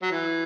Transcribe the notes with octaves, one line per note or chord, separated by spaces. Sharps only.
F#3
E3